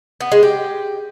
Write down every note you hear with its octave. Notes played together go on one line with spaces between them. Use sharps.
B3
G#3
G4